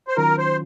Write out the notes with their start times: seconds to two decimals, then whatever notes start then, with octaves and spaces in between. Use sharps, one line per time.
0.08 C5
0.17 D#3 F#3 C#4 F4 A#4
0.38 C5